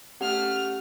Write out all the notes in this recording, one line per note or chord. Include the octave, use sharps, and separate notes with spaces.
A3 C#4 G4 F#5 F6